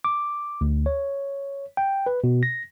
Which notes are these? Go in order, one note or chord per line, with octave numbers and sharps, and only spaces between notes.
D6
D2
C#5
G5
B4
B2
A#6